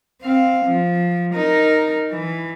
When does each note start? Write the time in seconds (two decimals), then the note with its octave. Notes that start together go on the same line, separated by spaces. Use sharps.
0.22 C4 F5
0.66 F3
1.34 D#4 A#4
2.11 E3